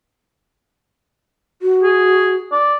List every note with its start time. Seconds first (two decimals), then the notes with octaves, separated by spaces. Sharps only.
1.62 F#4
1.83 G#4
2.52 D5